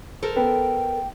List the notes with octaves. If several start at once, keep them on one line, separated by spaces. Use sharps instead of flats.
A4 A#4 C5
B3 G5